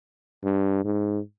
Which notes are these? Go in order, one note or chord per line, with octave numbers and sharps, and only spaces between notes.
G2
G#2